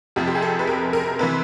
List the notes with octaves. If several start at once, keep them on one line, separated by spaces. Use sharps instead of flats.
F2 C3 F3 G4
G4
G#4
A4
B4
A#4
A#4
C3 E3 B4